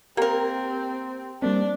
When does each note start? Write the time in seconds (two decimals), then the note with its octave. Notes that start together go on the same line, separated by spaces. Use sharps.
0.17 A#3 C4 G4 A#4
1.42 G3 A#3 C4 D4